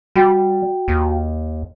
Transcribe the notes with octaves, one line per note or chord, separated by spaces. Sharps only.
G3 F#4 G5
D#2